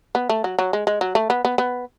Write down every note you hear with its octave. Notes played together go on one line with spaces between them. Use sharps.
B3
A3
F#3
F#3
G#3
G#3
F#3
A3
B3
B3
B3